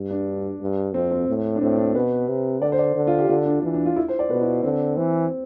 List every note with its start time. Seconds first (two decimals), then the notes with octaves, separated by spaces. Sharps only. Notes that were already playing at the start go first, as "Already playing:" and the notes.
Already playing: G2
0.11 D4
0.61 G2
0.94 F2 C4
1.11 C4
1.28 A2
1.56 D4
1.61 A2 C4
1.78 D4
1.95 B2 B4
2.28 C3
2.62 D3 D5
2.72 C5
2.78 D5
2.95 D3
3.07 F4
3.18 G4
3.29 D3 F4
3.46 D4
3.63 E3 D4
3.74 D4
3.85 F4
3.96 E4
4.08 C5
4.19 D5
4.30 B2 B4
4.41 E4
4.63 D3 C4
4.97 E3 C4